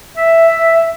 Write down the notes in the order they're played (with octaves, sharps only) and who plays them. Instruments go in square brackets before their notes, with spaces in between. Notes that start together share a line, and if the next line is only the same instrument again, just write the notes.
[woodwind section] E5